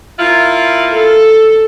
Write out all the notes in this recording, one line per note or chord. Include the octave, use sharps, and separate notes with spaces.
A#3 E4 F4
A4